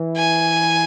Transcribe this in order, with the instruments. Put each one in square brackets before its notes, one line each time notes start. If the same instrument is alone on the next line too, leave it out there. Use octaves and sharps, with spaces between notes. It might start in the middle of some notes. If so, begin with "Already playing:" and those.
Already playing: [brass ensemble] E3
[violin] G#5